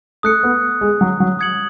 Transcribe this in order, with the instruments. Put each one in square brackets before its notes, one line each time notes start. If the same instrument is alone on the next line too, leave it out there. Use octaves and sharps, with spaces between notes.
[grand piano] A3 [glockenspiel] D#6 F#6 C#7
[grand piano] B3
G#3
F#3
F#3
[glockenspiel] D#6 G#6 C#7 F#7